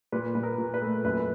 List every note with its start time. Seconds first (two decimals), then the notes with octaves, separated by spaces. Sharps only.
0.12 A#2 B4
0.35 A#2 B4
0.43 A#4
0.58 A#2
0.74 B4
0.82 A3
1.04 F#2 B4